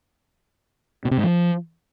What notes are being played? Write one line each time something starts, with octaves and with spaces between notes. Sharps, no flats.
B2
C3
G#2
F3